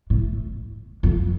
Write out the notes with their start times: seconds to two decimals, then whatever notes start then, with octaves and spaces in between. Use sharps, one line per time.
0.10 A2
1.03 F2